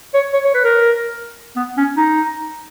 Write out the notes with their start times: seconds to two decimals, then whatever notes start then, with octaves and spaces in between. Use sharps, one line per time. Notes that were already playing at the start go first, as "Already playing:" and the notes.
0.14 C#5
0.34 C#5
0.45 C#5
0.54 B4
0.64 A#4
1.56 B3
1.77 C#4
1.97 D#4